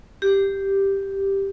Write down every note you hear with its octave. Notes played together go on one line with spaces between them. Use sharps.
G4